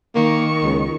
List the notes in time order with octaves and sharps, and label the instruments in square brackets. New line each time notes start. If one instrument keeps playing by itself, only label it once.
[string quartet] D#3 C#6 [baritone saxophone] A#3
[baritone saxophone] C#2